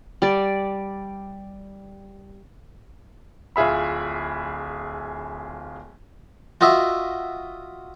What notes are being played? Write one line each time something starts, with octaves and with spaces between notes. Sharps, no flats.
G3 D5
D1 F4 G#4 E5 B5
F4 F#4 D#5 E5